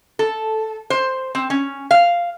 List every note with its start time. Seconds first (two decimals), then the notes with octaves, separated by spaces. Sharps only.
0.19 A4
0.90 C5
1.35 C4
1.50 C#4
1.91 F5